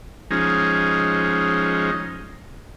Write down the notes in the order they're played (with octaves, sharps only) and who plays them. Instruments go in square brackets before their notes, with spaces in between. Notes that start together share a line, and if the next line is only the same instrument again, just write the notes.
[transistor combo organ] F3 G#3 C#4 D#4